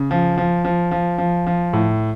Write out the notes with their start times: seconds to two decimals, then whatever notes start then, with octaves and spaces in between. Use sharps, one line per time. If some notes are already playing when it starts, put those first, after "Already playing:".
Already playing: C#3
0.11 F3
0.38 F3
0.65 F3
0.91 F3
1.18 F3
1.47 F3
1.73 A2